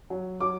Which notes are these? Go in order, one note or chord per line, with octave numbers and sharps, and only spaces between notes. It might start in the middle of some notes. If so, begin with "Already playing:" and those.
F#3
F#3 D6